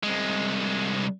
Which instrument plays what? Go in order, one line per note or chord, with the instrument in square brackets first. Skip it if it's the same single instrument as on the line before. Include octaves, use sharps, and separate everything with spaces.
[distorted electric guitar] C2 G#3